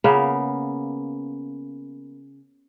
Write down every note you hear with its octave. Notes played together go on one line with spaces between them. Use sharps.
C#3 A#3 B3